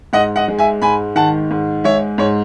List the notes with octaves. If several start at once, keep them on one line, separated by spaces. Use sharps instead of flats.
G#2 D#5 F#5
D#5 F#5
G#3
E5 G#5
G#2 G#5 B5
D#3 F#5 A5
G#2
G#3 C#5 E5
G#2 C#5